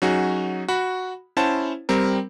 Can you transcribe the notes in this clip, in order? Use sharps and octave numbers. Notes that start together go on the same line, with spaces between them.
F#3 C#4 D#4 F#4 G#4
F#4 B5
C#4 E4 C5 F#5 A5
G3 C4 A#4